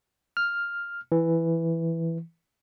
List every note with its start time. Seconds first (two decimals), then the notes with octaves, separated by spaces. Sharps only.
0.37 F6
1.12 E3